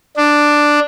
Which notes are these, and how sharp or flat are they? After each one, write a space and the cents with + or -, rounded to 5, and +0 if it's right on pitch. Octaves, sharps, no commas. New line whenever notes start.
D4 +5